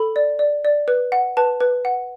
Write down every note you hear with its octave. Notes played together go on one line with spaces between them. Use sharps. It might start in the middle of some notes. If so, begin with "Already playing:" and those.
Already playing: A4 B5
D5
D5
D5
B4
F#5
B4 A5
B4
F#5